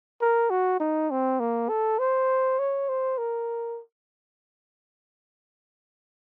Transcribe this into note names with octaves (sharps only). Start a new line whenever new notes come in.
A#4
F#4
D#4
C4
A#3
A4
C5
C#5
C5
A#4